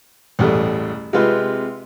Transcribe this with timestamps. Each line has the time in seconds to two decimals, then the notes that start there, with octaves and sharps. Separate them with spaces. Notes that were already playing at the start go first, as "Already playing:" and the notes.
0.39 A1 E2 G3 A3
1.13 C3 G#3 C4 F4 B4